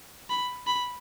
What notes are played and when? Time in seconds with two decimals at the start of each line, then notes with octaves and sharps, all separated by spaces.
0.30 B5
0.67 B5